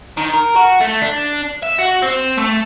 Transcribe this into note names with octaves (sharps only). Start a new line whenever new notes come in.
D#3
A#4
F#4
A3
D4
E5
F#4
C4
A3